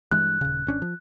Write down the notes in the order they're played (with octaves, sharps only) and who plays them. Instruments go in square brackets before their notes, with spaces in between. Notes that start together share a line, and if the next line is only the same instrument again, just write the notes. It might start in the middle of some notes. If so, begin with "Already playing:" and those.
[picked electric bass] G2 E3 G#3 [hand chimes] F#6
[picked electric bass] D#1 C#3
G#1 C#4 D4
F3